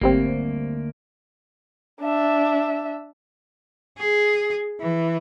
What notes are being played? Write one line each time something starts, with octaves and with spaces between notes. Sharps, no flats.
G#1 D2 G3 A#3 C4
D4 E5
G#4
E3